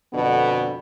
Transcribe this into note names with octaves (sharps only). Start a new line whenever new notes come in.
F2 B2 D3 B3 D4